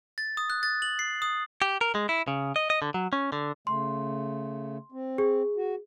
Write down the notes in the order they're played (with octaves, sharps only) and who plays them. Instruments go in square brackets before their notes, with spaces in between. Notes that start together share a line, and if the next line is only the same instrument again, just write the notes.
[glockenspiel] A6
D#6
F#6
A6
F#7
C7
D#6
[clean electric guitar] G4
A#4
G#3
E4
C#3
D#5
D#5
D3
F#3
C#4
D3
[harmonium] C#3 A3 [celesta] C6
[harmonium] C4
[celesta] G#4
[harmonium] F#4